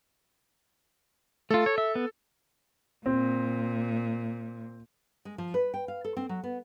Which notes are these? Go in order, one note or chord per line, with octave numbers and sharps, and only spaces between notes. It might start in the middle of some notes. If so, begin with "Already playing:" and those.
A3 F4 A4
C#5
E5
B3
A#2 C4
G#3
F3
B4
G5
F5
A4
C4
F#3
B3